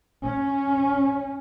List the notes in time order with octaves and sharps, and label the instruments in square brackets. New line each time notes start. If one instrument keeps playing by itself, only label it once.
[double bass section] C#4